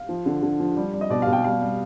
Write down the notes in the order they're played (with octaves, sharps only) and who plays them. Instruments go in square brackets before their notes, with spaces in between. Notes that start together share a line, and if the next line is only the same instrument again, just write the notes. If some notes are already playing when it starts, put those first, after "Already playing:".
Already playing: [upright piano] F5
F3
D3
D3
F3
G3
G3
D#5
B2 D5
F5
B2
G5
G3 F5
G3